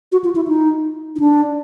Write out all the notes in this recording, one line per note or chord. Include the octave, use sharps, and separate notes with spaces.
F#4
F4
E4
D#4
D#4
D4